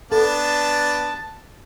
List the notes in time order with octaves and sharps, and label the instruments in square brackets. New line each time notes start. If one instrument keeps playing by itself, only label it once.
[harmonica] B3 D4 [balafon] A4 [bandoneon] A5